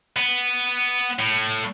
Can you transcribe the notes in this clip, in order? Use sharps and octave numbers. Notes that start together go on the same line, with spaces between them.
B3
A2